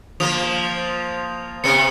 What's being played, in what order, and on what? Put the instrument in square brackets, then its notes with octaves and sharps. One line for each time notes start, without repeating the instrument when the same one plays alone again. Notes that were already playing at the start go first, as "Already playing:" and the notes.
[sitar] F3 A#3 [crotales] D#6 F7
[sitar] C3 B3 [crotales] C#7